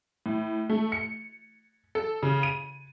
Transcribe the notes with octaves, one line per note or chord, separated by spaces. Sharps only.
A2
A3
C#7
A4
C#3
D#7